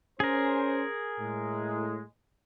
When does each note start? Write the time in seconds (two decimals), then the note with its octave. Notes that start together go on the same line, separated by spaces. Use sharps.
0.20 C#4 G#4 A#4 C5
1.19 A2 G#3